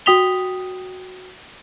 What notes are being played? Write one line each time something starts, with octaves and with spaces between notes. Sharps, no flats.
F#4 G5 D#6 B6 F7 G7